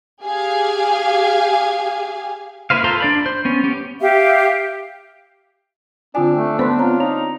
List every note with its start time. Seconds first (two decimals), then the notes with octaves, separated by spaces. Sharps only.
0.23 G4 G#4 F5 G#5
2.70 A#3 E4 B4 C5 F5
2.84 F4 A4 C5 A#5 C6
3.00 D4 D5 B5
3.26 C5
3.45 B3 C#4
3.63 B3 C#4 G4
4.01 G4 E5 F5
6.15 D3 C4 D4 F4 G#5
6.36 A3
6.59 B3 B4 C5 A5 C6
6.78 C4 F4 C#5 A#5
7.00 D#4 C#5 A#5